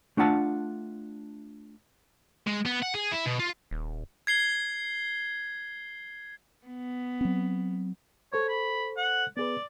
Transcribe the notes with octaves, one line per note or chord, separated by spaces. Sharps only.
A3 D4 F4 F#5 A5
G#3
B3
F#5
G#4
E4
B2
F4
D#1
G#6 C7 G7
B3
F#3 C4
A4 C5 C#5 C#6
B5
F#5
B3 G#4 B4 D5